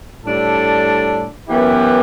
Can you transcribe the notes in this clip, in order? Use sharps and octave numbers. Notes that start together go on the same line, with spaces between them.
A2 G3 D4 A4
F#2 E3 B3 E4 G4